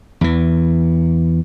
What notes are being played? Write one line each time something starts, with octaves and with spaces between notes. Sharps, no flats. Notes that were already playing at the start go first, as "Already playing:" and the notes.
E2 E3